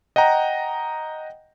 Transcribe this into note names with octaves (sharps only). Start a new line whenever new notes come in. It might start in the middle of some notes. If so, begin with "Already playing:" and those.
D#5 F#5 G5 A#5